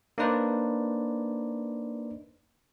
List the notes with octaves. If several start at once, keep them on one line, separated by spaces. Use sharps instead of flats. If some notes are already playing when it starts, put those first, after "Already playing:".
A#3 D4 D#4 B4 C5 D5